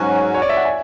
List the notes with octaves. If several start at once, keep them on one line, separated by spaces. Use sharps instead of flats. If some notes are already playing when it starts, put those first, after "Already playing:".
Already playing: G#2 F#3 C#4 F#4 G#5
C#5
D5
E5
F#5
G#5